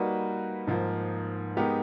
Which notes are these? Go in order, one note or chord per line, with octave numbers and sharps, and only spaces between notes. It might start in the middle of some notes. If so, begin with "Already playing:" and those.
Already playing: G3 A#3 D#4 F#4 B4
G#2 F3 A#3
G#3 B3 D#4 G4 A#4